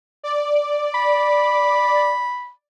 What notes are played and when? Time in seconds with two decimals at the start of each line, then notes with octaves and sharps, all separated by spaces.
0.23 D5
0.94 B5